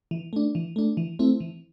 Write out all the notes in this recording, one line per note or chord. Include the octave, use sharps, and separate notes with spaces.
E3
A3 D4
E3
A3 D4
E3
A3 C4 E4
E3